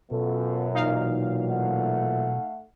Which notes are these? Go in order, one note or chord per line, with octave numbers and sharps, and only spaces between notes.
F#2 B2 B3 F4 A4
A#2 E3 F#3 D#4 F5
A3 F#5